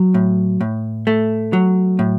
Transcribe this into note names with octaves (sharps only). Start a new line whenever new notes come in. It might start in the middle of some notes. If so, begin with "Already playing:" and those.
Already playing: F#3
A2
A2
A3
F#3
A2